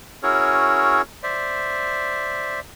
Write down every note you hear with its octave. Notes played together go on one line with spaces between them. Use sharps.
C#4 E4 F#4 G#4 A#4 C#5
C5 D5 E5